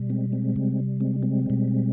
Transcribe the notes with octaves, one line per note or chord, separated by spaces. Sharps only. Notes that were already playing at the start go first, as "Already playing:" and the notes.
Already playing: B2 G3
G#3 C4
G#3 C4
C3 G3
G#3 C4
G#3 C4
B2 G3